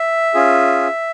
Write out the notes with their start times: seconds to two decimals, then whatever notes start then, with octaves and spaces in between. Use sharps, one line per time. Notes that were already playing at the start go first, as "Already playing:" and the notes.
Already playing: E5
0.34 C#4 F4 G#4